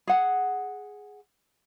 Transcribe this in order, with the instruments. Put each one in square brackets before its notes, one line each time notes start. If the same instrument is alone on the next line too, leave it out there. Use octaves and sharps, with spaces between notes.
[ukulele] G#4 F#5